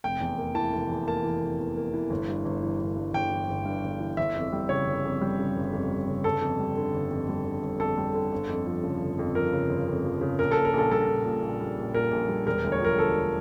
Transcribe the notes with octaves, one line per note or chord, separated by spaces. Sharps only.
F1 G5
E2
A#3
E3 A5
F1
E2
A#3 A5
E3
F1
E2
A#3
E3
G1
G2
G1
E3
G1
G2
G1 G5
E3
G1
G2
G1
E3
G1 E5
F2
G3
C#3 C#5
G1
F2
G3
C#3
G1
F2
G3
C#3
G1 A4
F2
G3
D3
G1
F2
G3
D3
G1
F2 A4
G3
D3
G1
F2
F3
C#3
G1
F2
F3 A#4
C#3
G1
F2
F3
C#3
A#1 A#4
A#2 A4
A#4
A#1 A4
G3 A4
A#1
A#2
A#1
G3
A#1
A#2 A#4
A#1
G3
E1 A#4
D2
C#5
F3 A#4
D3 A4